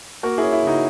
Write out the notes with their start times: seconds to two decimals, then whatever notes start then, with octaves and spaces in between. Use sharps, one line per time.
0.23 A#3 F#4 A#4
0.38 E4 G#4
0.43 C#4
0.53 E4
0.63 C#3 D#4 F#4